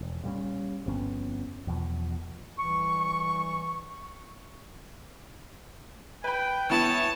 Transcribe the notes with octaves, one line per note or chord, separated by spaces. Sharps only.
E1
A#2 G3 A#3 C#4
G1 F2 B3 C#4
E2 B2 F3
C2 E3 C#6
B4 G5 B5
E3 B3 E4 C#5 A5